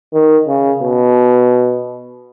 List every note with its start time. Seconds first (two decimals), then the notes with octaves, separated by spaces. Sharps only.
0.14 D#3
0.47 C#3
0.82 B2